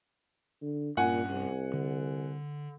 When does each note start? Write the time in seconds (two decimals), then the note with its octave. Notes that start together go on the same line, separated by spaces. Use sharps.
0.62 D3
0.97 G2 A#2 C#4 F#5 G#5
1.30 C2
1.73 D3